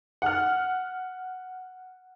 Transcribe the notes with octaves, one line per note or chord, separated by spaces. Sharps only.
F#5 F6